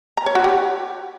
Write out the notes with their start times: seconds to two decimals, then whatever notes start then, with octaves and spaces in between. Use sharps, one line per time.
0.17 A#5
0.26 C#5
0.35 F#4
0.44 G4